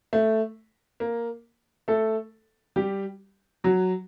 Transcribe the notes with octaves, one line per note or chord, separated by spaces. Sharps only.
A3
A#3
A3 A4
G3 G4
F#3 F#4